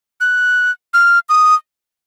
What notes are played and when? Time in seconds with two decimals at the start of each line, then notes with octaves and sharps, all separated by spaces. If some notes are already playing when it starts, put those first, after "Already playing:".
0.21 F#6
0.94 F6
1.29 D#6